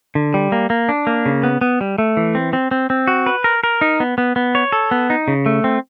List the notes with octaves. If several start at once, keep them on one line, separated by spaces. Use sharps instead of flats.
D3
G3
A#3
A#3
D4
A#3
C#3
B3
B3
G3
A3
E3
C4
C4
C4
C4
F#4
B4
A#4
A#4
D#4
B3
B3
B3
C#5
A4
B3
D#4
C#3
A3
C4